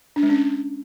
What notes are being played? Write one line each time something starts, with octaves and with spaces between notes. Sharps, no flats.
D4
G#3
C#4